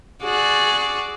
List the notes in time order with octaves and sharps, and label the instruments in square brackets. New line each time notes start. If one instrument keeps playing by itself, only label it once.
[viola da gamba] F#4 G#4 D5